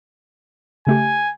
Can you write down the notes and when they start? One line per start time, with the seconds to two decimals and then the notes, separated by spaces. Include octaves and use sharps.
0.87 C#3 A3 G4 G#5